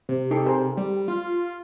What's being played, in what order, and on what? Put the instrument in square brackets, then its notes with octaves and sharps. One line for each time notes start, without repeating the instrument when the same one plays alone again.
[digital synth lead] C3
[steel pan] D#4 G4 A4
G#4 A#4 C5
[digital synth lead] G3
F4